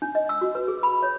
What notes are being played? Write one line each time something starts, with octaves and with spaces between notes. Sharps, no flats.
D4
D#5
E6
F#4
B4
G#4
B5
C#5